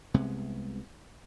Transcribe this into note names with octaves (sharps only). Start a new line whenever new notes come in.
C2 C3 G#3 B3